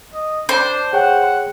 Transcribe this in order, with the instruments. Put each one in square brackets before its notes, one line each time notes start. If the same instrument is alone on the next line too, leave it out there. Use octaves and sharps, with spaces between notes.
[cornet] D#5
[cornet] D4 [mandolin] C5
[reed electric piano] G#4 C#5 G5 [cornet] F#5